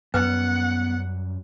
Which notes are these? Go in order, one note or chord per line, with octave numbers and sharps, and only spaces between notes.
F#2 G3 B3 B4 F#5 G5